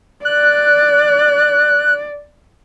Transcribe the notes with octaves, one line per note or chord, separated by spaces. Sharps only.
D5 F#6